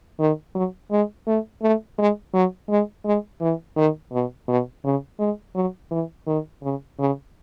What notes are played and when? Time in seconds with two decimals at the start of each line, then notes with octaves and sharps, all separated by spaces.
0.19 D#3
0.55 F#3
0.91 G#3
1.27 A3
1.62 A3
1.98 G#3
2.34 F#3
2.69 G#3
3.05 G#3
3.41 E3
3.77 D#3
4.12 B2
4.48 B2
4.84 C#3
5.19 G#3
5.55 F#3
5.91 E3
6.27 D#3
6.63 C#3
6.99 C#3